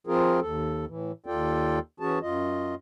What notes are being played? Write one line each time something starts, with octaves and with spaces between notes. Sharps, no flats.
F3 C4 F4 G#4 A#4
D#2 A4
A2 E3
D#2 F4 A4 D5 G5
E3 C#4 F#4 G#4 A5
F#2 F4 D#5